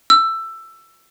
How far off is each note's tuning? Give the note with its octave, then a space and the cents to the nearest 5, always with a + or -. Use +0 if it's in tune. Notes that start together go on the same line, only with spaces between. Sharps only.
E6 +15